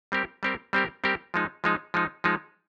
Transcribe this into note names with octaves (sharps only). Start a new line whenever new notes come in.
G3 C4 G4 A#4
G3 C4 G4 A#4
G3 C4 G4 A#4
G3 C4 G4 A#4
F3 G#3 D#4
F3 G#3 D#4
F3 G#3 D#4
F3 G#3 D#4